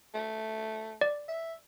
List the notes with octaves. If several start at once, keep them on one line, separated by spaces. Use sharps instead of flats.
A3
D5
E5